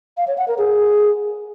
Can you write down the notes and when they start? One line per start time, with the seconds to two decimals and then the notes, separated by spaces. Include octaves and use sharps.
0.17 F5
0.28 C#5
0.38 F#5
0.48 A#4
0.58 G#4